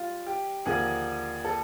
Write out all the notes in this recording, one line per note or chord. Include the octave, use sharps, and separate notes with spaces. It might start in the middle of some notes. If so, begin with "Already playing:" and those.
Already playing: G3 F4
G4
D#2 D3 F3 A#3 G#4
A4